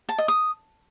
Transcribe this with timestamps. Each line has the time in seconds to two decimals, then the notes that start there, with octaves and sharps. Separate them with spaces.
0.09 A5
0.18 D#5
0.28 D#6